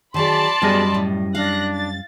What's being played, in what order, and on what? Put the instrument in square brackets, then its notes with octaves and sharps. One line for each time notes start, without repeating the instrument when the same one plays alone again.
[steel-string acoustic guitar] D#3 F#3 G#4 [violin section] D5 A5 B5 [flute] C6
[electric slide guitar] F#2 G3 D#5 [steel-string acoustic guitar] B3 F#4 G#4
[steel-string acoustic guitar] A2
[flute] D4 [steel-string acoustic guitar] F5 [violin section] F#6 A#6
[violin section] A6